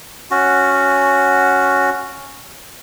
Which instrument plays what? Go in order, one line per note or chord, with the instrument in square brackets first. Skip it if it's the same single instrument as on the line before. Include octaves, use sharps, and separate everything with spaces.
[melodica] C#4 F#4